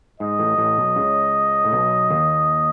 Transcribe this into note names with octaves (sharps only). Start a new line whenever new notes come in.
G#2 D#5
A1 A2
A1 A2
B1 B2
C#2 C#3
A2
B1 B2
D#2 D#3